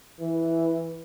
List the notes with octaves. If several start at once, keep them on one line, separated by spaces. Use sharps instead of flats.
E3